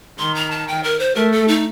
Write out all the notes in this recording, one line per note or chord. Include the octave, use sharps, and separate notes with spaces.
D#3 C6
A#5
A5
G5
A#4
C5
A3 A#4
A4
D#4